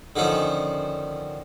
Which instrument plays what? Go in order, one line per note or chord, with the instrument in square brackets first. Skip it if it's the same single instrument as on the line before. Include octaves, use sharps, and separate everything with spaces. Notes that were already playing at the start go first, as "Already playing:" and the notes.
[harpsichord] D3 D#3 F3 C#4